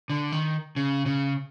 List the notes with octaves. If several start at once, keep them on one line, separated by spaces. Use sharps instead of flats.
D3
D#3
C#3
C#3